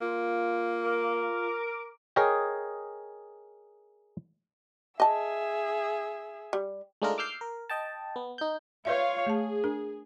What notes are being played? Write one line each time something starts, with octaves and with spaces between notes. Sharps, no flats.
A#3 F4
A#4 D6
G#4 A#4 C#5 D#5 G5
G#4 D#5 E5 A5
G3
G#3 A3 D4 D#4 F4 A#4
D6 E6 F6 G6 C7
A#4
D#5 G5 A5
B3
D#4 G6
F4 B4 C#5 D5 E5 F5
A3 G#4 A5
D4 A#4